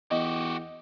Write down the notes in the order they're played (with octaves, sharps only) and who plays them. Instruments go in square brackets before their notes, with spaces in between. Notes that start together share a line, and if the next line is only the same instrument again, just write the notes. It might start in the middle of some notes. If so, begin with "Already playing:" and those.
[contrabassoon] E2 [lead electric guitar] F#4 G4 [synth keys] D#5